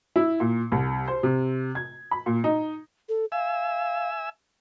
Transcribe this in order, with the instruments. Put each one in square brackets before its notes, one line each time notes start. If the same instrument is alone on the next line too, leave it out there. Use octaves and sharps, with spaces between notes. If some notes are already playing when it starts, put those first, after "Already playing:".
[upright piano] E4
A#2
C2
C5
C3
G#6
B5
A#2
D#4
[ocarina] A4
[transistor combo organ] E5 G#5 E6 [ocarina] F5